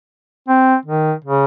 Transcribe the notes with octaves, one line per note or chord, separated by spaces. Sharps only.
C4
D#3
C#3